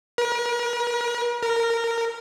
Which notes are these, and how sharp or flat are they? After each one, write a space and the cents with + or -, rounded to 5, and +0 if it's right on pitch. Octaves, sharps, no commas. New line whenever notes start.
A#4 +45
A#4 -15